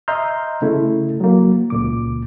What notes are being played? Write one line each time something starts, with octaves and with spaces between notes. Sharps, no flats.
D#5 E5 A#5 C6 F6 G6
C#3 A3 E4
F#3 A#3
C#2 A#2 D6